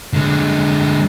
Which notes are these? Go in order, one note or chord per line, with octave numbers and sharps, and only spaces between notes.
D3 G#3